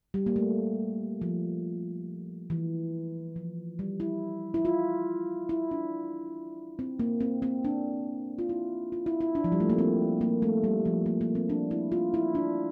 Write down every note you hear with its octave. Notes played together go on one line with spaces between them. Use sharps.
G3
A#3
A3
F3
E3
F3
G3
E4
E4
F4
E4
D4
C4
A#3
C4
C4
D4
F4
E4
F4
E4
E4
D4
F3
G3
A3
A#3
C4
A#3
A3
G3
F3
A#3
A#3
C4
D4
E4
F4
E4
D4